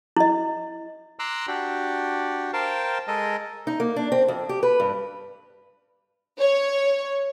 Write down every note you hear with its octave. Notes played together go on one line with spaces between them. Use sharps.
E4 D#5
A#5 C6 D6 E6 F#6
D4 F#4 G4
A#4 C5 F5 G5 A5
G#3 A4 A#4 D#5
D#4
A#3
D4
C4
F2
G4
B4
G2
C#5